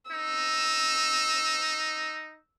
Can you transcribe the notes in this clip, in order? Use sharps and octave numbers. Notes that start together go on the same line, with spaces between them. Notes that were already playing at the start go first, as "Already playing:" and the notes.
D#4 E6